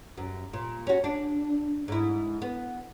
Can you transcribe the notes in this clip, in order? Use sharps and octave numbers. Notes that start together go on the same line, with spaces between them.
F#2
A#2
C#4 F#4
D4
G#2 E4
B3